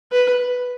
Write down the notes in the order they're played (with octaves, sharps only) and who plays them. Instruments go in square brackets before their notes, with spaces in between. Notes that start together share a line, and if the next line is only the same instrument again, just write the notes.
[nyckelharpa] B4